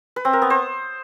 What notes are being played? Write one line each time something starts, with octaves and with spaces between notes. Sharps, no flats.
B4
C4
A#4
B3
C5